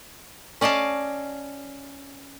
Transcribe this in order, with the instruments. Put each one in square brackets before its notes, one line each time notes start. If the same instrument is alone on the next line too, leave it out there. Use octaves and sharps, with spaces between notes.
[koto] C#4 D5 D#5 F5 A5